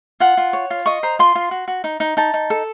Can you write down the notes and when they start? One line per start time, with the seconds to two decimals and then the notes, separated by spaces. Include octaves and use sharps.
0.20 F4 F#5
0.37 F4
0.53 C#5
0.70 F4
0.86 D#5 C#6
1.03 C5 A#5
1.19 F4 C6
1.35 F4
1.51 F#4
1.68 F#4
1.84 D#4
2.00 D#4
2.17 D#4 A5
2.34 D#4
2.50 A4